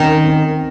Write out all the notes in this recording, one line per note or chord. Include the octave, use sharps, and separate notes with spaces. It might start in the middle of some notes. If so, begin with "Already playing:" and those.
Already playing: D#3 C4 C#4 D#4
C4